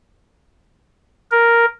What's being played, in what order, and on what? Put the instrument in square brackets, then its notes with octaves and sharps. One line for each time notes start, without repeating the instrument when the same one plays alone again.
[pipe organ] A#4